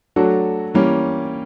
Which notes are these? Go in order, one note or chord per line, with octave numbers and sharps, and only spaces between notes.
F#3 A3 D4 F#4 A4
E3 G3 A#3 C#4